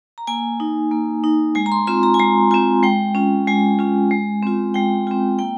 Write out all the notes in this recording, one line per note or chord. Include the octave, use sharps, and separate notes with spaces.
A#5
A#3 G#5
D#4
A#3
D#4
G#3 G#5
A#5
C6
C4 F4 C6
A#5
G#5
G#3 A#5
C4 F4 G#5
G#3 G5
C#4 F4
G#3 G#5
C#4 F4
G#3
C4 F4
G#3 G5
C4 F4
A#3 G5